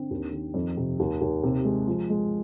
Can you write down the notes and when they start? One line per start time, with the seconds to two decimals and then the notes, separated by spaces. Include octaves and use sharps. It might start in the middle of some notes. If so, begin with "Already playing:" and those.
Already playing: D3 C4
0.11 D#2
0.33 D#3
0.54 F2
0.77 C3
0.99 D#2
1.21 D#2
1.43 C3
1.65 G#3
1.88 F3
2.10 G#3